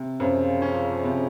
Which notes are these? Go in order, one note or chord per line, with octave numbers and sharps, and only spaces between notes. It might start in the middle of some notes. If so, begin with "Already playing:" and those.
Already playing: C3
F#2 C#3 F3
C#4
C3